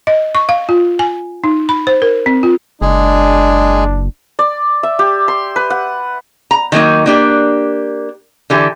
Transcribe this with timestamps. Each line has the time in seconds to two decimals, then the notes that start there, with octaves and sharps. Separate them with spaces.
0.07 D#5
0.35 C#6
0.49 F5
0.69 F4
0.99 G#5
1.44 D#4
1.69 B5
1.87 C5
2.02 A#4
2.26 C4
2.43 F4
2.82 F#1 G#3 D4 G#4
4.39 D5
4.83 E5
4.99 G4
5.28 C6
5.56 B4
5.70 F#5
6.51 A#5
6.72 D#3 F#3 A#3 D#4
7.06 A#3 D4 G4
8.50 D3 E3 G4